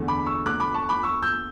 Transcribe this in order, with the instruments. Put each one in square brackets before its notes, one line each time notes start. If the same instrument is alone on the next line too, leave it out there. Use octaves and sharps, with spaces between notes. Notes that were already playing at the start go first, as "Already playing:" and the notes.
Already playing: [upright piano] E2 D3 A3
B5 D6
C#6 E6
D6 F#6
B5 D6
A5 C#6
B5 D6
C#6 E6
E6 G6